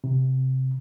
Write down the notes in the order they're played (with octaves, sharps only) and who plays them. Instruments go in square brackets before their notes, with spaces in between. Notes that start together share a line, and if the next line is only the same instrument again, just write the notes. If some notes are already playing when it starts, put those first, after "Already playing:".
[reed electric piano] C3